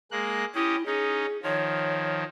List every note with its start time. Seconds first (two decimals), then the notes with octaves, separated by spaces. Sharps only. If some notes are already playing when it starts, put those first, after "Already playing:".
0.11 G#3 A#3 F#6
0.55 C#4 E4 G4 D#5
0.86 C#4 D#4 G#4
1.43 D#3 F3 C#5